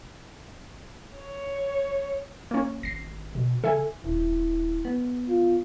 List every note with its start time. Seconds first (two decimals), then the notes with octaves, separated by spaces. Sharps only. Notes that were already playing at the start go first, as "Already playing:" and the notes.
1.13 C#5
2.51 A#3 C#4
2.83 G#1 A#6 C7
3.35 B2
3.64 C#3 A4 E5 G#5
4.04 D#1 E4
4.85 B3
5.28 F4